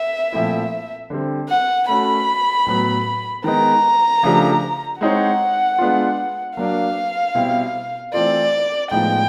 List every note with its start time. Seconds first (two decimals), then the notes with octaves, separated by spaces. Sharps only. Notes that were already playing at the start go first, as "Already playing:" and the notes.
Already playing: E5
0.32 A#2 F3 A3 C4 E4
1.10 D3 G3 C4
1.49 F#5
1.88 A3 C#4 F#4 B5
2.66 A2 F#3 B3
3.44 D#3 G#3 B3 D#4 A#5
4.23 C#3 F3 A3 D4 G4
5.01 G#3 C4 D#4 G#4 C#5 F#5
5.78 G#3 B3 D4 F4
6.57 F#3 A#3 D4 F5
7.35 B2 G3 C4 E4
8.13 E3 A3 C4 F4 A4 D5
8.90 A2 F3 G#3 B3 D#4 G5